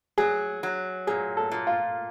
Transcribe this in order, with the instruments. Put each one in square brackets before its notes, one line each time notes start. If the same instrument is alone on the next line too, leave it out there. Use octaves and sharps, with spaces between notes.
[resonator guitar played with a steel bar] F#3 [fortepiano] G#4
[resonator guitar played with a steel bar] F#3
[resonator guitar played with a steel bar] A#2 [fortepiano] G#4
[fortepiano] A4
[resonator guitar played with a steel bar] A#2
[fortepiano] F4